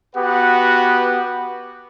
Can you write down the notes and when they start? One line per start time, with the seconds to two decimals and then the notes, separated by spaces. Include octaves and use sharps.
0.15 B3 F#4 G4 B4 F#5